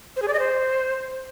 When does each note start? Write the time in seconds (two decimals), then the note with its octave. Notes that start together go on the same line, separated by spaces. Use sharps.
0.16 C5
0.22 G#4
0.28 D5
0.34 D#5
0.39 C5